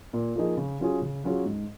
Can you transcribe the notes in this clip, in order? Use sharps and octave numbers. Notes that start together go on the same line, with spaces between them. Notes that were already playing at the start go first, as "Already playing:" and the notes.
A#2
F3 A#3 D#4 G#4
C#3
F#3 C#4 F4 G#4
C#3
F#3 C#4 F4 G#4
G#2